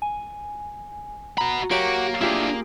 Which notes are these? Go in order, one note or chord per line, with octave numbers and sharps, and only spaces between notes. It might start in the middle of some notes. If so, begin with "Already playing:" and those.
G#5
F#4 A#5 B5
F#3 A#3 F#4 G4 D7
D4 E4 F4 G4 G#4